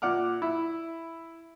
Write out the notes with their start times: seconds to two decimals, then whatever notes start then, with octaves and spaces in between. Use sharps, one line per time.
0.02 A#2 D5 F#5 D6 F6
0.42 E4